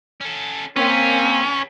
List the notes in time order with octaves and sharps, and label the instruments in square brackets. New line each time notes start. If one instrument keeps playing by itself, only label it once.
[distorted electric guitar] C#4 A4
[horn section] A#3 C4 [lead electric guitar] C#4 [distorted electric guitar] G#4 B4